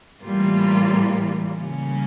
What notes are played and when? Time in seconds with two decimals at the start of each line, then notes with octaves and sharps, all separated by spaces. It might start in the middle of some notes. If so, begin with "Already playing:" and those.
0.23 A2 E3 G3 A#3 F4
1.55 C#3 G3 A#3 C#4